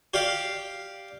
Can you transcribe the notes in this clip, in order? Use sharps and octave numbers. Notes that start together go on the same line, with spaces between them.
G4 D5 F5